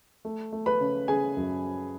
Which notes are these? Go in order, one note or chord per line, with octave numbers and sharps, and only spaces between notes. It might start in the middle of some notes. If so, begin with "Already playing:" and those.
A3
A3
B4 B5
C#3
C#3 G#4 G#5
F#2